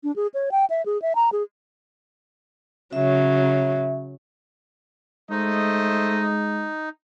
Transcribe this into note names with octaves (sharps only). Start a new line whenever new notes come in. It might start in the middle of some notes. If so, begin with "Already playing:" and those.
D4
G#4
C#5
G5
E5
G#4
E5
A#5
G#4
C#3 F#3 E5
G#3 A3 D#4 C5 D#5